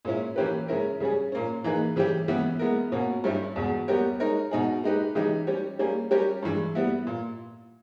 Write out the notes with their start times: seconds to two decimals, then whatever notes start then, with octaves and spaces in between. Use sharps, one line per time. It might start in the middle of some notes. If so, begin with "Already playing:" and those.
0.05 A#2 G#3 C#4 E4
0.36 E3 A#3 C#4 G4 B4
0.68 C#3 G#3 C#4 E4 A#4
1.00 C#3 G3 C#4 G#4
1.32 A#2 A#3 C#4
1.64 E3 A#3 D#4 G#4 B4
1.96 C#3 E3 G3 C#4 G4
2.28 C#3 E3 G#3 B3 E4
2.59 G#3 B3 E4 A#4
2.92 B2 A#3 C#4
3.24 G2 G3 C#4 E4 G4
3.56 E2 B2 G#3
3.88 G3 B3 G4 A#4 C#5
4.20 G#3 D#4 A#4 C#5
4.51 B2 G#3 D#4 G#4
4.84 G#3 D#4 G4 B4
5.15 C#3 E3 G#3 D#4 G4
5.47 G3 C#4 G4 C#5
5.79 G3 A#3 C#4 G#4
6.11 G3 C#4 G4 A#4 C#5
6.43 G2 E3 G#3
6.75 G3 B3 E4
7.07 A#2